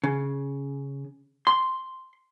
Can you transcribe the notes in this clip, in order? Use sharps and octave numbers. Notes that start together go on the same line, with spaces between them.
C#3
C6